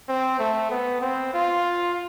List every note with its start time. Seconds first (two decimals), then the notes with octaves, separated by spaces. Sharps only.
0.09 C4
0.39 A3
0.70 B3
1.02 C4
1.33 F4